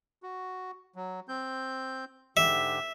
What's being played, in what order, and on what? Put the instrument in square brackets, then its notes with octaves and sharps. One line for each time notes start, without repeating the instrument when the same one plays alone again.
[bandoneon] F#4
F#3
C4 G6
[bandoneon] G#2 D3 G4 [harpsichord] E5